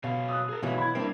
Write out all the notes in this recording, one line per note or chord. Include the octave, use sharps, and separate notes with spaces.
B2 F#3 C#5 F5
D#6 E6 F#6
G#4 A#4
G#2 B2 D#3 E3 F#3 E5 F5
E4 B5 G#6
G3 A#3 C4 D4 E4 D7